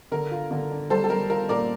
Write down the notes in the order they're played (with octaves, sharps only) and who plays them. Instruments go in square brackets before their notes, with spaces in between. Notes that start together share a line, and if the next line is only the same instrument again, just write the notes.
[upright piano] D3 [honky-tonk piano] A#4
[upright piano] F4
D3
D4
[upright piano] G3 [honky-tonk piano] A4 C5
[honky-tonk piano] A4
[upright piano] G3 [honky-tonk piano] A#4
[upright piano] F4 [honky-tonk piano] A#4
[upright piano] A#2 [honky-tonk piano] A#4 D5